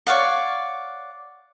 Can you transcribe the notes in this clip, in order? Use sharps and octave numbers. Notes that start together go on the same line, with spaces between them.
C#5 D5 F5 F#5